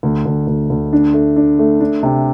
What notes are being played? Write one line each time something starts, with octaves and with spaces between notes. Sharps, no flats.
D2
D2
D2
D2
D4
A3
D4
A3
D4
C3